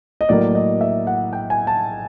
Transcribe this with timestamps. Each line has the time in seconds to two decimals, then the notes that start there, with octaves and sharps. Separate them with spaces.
0.21 D#5
0.29 A2 F#3 A#3 D5
0.55 D#5
0.81 E5
1.07 F#5
1.33 G5
1.50 G#5
1.67 A5